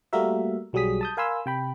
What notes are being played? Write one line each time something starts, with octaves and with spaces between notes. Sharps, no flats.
G3 A3 A#3 F#4 A#4 E5
B1 F#3 G3 G#4 D#6 B6
A5 D#6 G6
A#4 F5 G#5 B5 C6 E6
C3 G5 B5